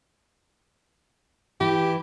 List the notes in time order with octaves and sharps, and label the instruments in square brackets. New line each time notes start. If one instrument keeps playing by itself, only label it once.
[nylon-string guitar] E3 [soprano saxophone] G4